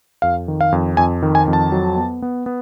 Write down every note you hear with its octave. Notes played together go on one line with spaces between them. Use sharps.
F2 F5
D#3
F5
F2
F2 G#5
D#3
G#5
F2
A5
F#3
B3
B3
B3